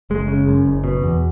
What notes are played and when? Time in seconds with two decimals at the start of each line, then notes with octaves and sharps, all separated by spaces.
0.10 F#1 G#3
0.28 C#3
0.48 F#2
0.65 F#1
0.84 B2
1.04 E2